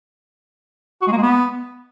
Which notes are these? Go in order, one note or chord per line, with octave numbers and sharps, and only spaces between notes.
F#4
G#3
A#3
G#3
B3